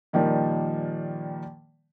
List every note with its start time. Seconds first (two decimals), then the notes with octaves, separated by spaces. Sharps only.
0.13 A#2 D#3 F3 G3 A#3